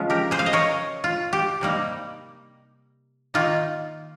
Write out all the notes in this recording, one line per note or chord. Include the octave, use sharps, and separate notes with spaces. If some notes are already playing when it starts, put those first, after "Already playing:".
Already playing: C#3 F3 G#3 C#4 F4
G4 A#4
G#4 C5
F5
D#5
A#4 C#5
F4
G4
C3 G3 A#3 D#4
D#3 A#3 D#4 F4